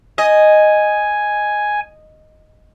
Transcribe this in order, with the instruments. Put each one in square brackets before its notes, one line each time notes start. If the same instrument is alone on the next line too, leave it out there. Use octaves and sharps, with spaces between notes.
[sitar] D#5 [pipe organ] G#5